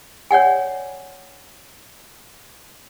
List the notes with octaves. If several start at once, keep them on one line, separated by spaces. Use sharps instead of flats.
C#5 D5 F#5 G#5